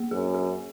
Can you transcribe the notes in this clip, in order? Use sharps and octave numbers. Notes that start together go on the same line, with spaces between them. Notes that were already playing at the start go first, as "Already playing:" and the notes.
Already playing: A#3 G#4
F#2 G#4
G#4